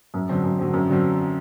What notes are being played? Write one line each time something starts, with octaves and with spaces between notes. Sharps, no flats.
F#2
D3 F#3 C4
F#2
D3 F#3 C4
F#2
D3 F#3 C4